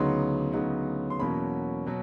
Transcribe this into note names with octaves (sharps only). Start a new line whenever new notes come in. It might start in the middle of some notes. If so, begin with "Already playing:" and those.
Already playing: D2 C#3 F#3 B3 D#4 C6
D2 C#3 F#3 B3 D#4
C6
E2 B2 F#3 A#3 C#4 B5
B2 F#3